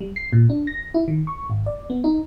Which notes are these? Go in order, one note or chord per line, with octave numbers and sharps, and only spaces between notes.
G3
C7
A#2
D4
A#6
E4
D#3
C#6
G#1
D5
B3
D#4